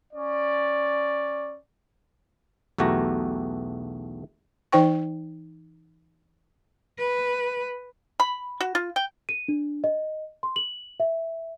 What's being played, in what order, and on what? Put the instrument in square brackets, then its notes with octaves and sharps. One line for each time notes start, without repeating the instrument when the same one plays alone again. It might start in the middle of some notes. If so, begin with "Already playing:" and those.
[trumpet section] C#4 D5
[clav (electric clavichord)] B1 E2 A3 F#4 G4 A#5
[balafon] E3 D#4 C5 G5 C#6
[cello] B4
[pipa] B5
F#4
F4
G5
[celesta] D#7
D4
D#5
C6
F#7
E5